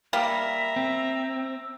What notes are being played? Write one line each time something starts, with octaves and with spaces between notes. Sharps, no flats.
G3 A#3 E5 A#5 B6
C4 E6